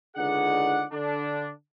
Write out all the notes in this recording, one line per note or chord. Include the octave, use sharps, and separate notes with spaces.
C#2 D3 D#4 G#4 D5 F#5
D3 D4